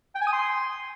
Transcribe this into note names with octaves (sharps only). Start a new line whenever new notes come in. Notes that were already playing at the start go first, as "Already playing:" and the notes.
G5
G#5
D#6
C6